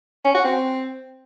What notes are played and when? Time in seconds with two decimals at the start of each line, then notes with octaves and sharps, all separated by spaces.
0.25 C#4
0.35 F#4
0.45 C4